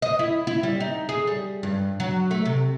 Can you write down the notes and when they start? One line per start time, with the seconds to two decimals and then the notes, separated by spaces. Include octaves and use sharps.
0.02 D#5
0.19 E4
0.47 E4
0.63 G3
0.80 D#4
1.09 G#4
1.27 G3
1.63 G2
2.00 F#3
2.31 A3
2.45 C3